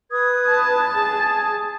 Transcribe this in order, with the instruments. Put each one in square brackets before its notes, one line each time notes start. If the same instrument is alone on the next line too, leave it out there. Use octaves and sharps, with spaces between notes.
[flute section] B4 D#6 G#6
[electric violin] A5
[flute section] G#4